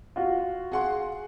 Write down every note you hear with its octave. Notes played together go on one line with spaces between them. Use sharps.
F4 F#4
G#4 F#5 C6